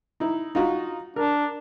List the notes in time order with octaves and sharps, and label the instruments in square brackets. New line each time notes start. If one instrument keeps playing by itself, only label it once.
[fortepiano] D#4 E4
D#4 F4 F#4
[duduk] D4 [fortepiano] A#4